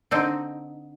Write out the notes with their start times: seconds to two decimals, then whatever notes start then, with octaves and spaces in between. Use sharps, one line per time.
0.11 D3 C4 D#4